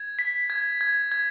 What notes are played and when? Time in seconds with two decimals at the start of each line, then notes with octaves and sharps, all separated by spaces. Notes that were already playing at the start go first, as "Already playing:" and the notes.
Already playing: G#6
0.19 B6
0.50 G#6
0.81 G#6
1.12 G#6